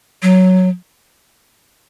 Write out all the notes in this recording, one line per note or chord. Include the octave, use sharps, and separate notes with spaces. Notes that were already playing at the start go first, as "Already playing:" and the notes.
F#3